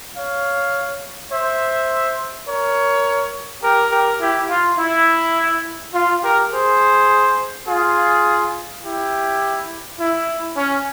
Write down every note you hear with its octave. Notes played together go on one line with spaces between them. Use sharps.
C#5 F5
C5 E5
A#4 C#5
G4 A#4
G4 A#4
E4 G4
F4
E4
F4
G4 A#4
G#4 C5
F4 G#4
E4 G4
E4
C#4